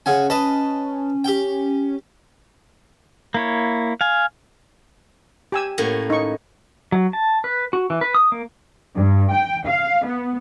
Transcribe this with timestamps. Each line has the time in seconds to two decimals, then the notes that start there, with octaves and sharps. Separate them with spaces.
0.06 C#3 C#4 F#5 G#5
0.30 B4 D#5 A5
1.24 G4 G5
3.34 A#3 E4 C#5
4.01 F5 G#5
5.52 G4 G#5 E6
5.78 A2 A#3 C#4
6.10 D#4 C#6
6.92 F#3
7.13 A5
7.44 B4
7.73 F#4
7.90 E3
8.01 B4
8.14 D#6
8.32 A#3
8.96 G2
9.33 G5
9.67 F5
10.06 B3